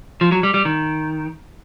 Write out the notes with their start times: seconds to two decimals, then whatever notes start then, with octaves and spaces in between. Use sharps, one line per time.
0.21 F3
0.32 F#3
0.43 G3
0.54 G3
0.65 D#3